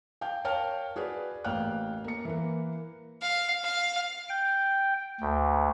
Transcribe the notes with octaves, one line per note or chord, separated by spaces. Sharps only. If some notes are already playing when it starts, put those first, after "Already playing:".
F5 G5 G6
A#4 C#5 F5 G5 A5 F6
F#4 G#4 B4 D5
A1 A#3 F5 G5 F6 F#6
A#3 C#7
E3 A#3
F5
F5
G5
D2